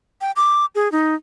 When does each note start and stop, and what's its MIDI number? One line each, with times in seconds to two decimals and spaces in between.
0.21 0.31 79
0.36 0.65 86
0.75 0.91 68
0.92 1.15 63